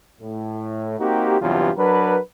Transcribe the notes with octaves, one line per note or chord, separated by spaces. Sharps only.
A2
A#3 C4 D#4 F#4 G4
E2 G2 C3 F#3 F4 G4
F#3 D4 A#4 B4